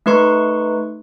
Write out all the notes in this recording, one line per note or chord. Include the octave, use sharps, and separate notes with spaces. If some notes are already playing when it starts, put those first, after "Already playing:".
A3 D#4 B4 C6 C#6